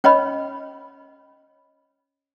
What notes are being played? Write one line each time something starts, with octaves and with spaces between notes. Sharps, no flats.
C#4 C#5 D#5 B5